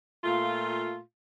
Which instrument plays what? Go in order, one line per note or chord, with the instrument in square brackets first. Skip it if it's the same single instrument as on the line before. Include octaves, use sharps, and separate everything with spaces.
[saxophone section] A#2 A3 F4